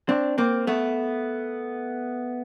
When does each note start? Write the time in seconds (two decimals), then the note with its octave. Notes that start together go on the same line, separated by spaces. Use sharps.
0.09 C4 D4
0.38 A#3 C4
0.67 A3 B3